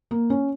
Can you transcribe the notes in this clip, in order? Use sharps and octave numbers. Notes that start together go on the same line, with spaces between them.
A#3
C#4